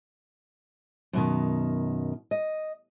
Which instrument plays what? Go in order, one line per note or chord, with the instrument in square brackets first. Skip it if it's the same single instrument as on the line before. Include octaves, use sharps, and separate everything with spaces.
[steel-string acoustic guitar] F#2 B2 D#3
D#5